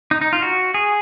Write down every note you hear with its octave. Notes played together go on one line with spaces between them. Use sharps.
D#4
D#4
F4
F#4
G#4